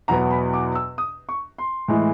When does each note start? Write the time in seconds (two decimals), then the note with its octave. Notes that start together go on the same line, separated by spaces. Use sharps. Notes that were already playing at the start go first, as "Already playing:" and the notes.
0.08 E2 B2 F#3 B3 A#5
0.31 B5
0.53 D6
0.75 E6
0.98 D#6
1.29 C#6
1.58 C6
1.88 A2 E3 G#3